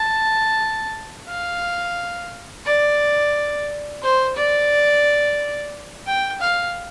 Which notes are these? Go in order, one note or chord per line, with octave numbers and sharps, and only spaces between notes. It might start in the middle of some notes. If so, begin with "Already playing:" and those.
Already playing: A5
F5
D5
C5
D5
G5
F5